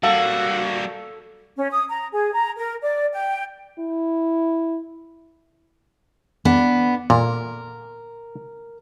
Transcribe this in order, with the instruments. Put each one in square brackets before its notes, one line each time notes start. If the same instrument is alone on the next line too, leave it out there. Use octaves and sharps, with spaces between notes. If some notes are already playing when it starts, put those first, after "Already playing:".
[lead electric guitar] G3 A#3 [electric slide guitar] F#4 [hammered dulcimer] A4 [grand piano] F5
[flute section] C#4
D#6
A#5
G#4
A#5
A#4
D5
G5
[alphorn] E4
[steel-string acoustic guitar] B3 D4
[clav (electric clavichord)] A#2 [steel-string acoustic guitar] A#4